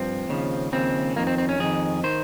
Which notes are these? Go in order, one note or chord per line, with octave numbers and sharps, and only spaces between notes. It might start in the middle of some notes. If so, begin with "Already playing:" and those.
Already playing: G2 F3 C4
D#2 C#3 F3
D#2 C#3 F3 C4
F2 D#3 A#3
C4
C4
C#4
F2 D#3 G#4
D#3 C5